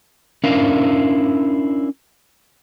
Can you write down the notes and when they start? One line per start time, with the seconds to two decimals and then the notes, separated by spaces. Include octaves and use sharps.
0.44 C#4 D4 E4 A#4 F5